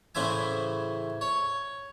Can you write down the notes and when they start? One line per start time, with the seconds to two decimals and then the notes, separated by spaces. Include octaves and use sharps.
0.15 A2 C#3 E3 C5 E5 G#5
1.21 C#5